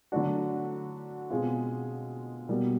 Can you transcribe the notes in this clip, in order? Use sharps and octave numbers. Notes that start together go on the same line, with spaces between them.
D3 F#3 A3 D4 F#4
B2 G#3 C4 F4
B2 G3 A#3